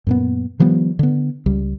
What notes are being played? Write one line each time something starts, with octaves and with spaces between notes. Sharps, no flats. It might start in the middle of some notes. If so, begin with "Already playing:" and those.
F#2 A#2 B3
D#3 F3 G3 B3
D3 B3
C#2 G3